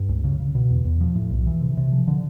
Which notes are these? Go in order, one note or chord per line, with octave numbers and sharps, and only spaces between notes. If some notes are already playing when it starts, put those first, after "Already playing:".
Already playing: G2
C#2
C#3
C#3
B2
E2
E2
F3
A2
B1
E3
C3
C3
F3
D3